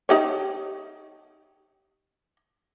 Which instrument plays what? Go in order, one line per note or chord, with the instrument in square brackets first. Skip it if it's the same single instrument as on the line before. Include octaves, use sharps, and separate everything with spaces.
[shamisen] D#4 G4 C#5